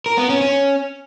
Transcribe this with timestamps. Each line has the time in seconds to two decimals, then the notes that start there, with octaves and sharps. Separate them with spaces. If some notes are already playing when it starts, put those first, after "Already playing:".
0.06 A#4
0.18 B3
0.29 C#4
0.41 C#4